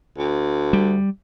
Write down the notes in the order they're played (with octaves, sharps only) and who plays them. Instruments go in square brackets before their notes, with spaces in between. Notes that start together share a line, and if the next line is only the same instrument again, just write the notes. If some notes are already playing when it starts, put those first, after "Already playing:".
[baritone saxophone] D2
[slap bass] G3